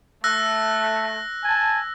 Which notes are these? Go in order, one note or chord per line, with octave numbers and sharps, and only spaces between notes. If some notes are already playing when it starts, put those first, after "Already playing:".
A3 E6 F#6 A#6
G#5 A5